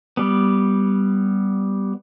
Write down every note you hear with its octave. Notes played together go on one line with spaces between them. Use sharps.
G3 B3